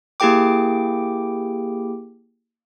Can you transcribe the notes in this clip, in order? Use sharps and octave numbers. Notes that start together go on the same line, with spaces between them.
A#3 E4 G4 G#4 G5 D6